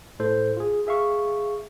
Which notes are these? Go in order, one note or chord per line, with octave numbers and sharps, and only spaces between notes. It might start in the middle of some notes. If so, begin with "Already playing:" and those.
A2 A4 C5
F4 G#4
G#4 E5 F5 C#6